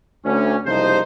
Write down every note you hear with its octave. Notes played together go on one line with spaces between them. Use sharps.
D2 C#4
F#1 C2 C3 F3 D#4 C5